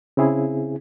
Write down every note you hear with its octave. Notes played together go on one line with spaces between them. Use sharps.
C#3 C4 E4 G#4